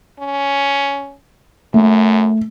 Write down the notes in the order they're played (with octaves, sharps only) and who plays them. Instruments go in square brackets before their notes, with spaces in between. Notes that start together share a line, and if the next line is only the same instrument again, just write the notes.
[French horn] C#4
[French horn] F#2 [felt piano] A3